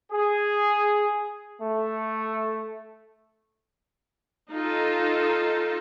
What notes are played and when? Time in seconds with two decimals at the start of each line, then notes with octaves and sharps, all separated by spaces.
0.12 G#4
1.61 A3
4.53 D#4 F4 A4